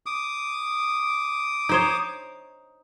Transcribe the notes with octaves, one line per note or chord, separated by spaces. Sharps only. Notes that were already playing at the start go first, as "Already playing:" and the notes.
D6 D#6
D#4 C5 C#5